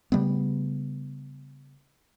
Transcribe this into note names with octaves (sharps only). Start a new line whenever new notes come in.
C#3 G3 A3 B3